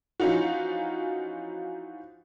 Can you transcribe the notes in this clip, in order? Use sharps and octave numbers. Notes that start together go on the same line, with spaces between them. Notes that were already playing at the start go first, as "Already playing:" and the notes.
E3 F3 C#4 D#4 F4 F#4